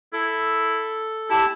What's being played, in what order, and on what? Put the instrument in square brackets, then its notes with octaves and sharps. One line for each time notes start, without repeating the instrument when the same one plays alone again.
[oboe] E4 [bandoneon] A4
[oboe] E4 [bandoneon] G4 E6 [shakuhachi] A5